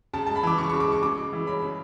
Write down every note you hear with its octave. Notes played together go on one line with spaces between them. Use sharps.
C#3 A5
G#3 A5
B5
E3 D6
C#3 C#6
C#3 C#6
D6
G#3 C#6
C#3 D6
G#3
E3
C#4 B5
C#3